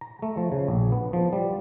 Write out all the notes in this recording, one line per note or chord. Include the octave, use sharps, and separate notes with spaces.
A#5
A3
F3
C#3
A#1
B3
F3
G3